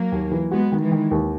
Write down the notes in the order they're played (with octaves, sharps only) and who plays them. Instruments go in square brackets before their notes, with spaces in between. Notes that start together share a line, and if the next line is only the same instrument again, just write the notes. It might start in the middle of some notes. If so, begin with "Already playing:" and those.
Already playing: [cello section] F#3 A#3
[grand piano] D#2
E3
[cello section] G#3 B3 [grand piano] F#4
[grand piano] D#3
[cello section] E3 G#3
[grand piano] D#3
D#2